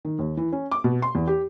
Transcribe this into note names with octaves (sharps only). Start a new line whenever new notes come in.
D#3
D#2
E3
C#4
D6
B2
C6
E2
G4